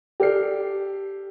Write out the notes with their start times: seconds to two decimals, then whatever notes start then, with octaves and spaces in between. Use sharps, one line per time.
0.20 G4 A4 D5 F6 C7